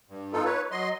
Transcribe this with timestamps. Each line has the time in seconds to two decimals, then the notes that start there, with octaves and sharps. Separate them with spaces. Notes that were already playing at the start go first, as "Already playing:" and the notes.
0.09 G2
0.33 B3 D#4 F4 A4
0.45 B4 C#5
0.71 F#3 D#5 C6